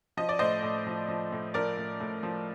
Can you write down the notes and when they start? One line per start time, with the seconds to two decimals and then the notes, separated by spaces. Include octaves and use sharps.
0.17 F3 D#5
0.29 D5
0.39 A2 C5 D#5
0.63 A2
0.87 F3
1.08 F3
1.32 A2
1.54 F3 A#4 D5
1.77 A2
2.01 A2
2.23 F3